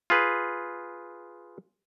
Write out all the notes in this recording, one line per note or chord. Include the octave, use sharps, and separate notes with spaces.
F4 G#4 B4